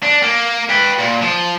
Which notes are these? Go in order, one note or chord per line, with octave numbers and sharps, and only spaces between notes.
D4
A#3
B4 G5
A#2
F3